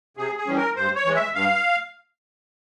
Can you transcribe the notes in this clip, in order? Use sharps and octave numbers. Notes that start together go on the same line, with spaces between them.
C3 G#4
G#4
E3 G3 C#4
A#4
G2 C5
C#5
E3 G#3
E5
G2 F5